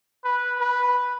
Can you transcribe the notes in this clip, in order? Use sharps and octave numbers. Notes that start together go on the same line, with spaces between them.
B4
B4